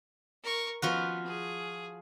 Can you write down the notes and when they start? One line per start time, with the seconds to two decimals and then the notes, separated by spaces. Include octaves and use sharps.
0.43 A#4 C#6
0.82 F3 B3 F4 F#4
1.25 G#4